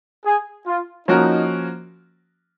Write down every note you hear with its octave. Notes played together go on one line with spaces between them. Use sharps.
G#4
F4
F3 A#3 C#4 D#4 F#4 A#4